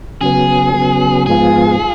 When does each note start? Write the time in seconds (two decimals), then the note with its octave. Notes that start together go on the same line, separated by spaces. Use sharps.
0.21 C#3 F#3 B3 G#4
0.74 C#3 F#3 B3
1.26 G#2 F3 G#3 B3 F4 G#4
1.79 F4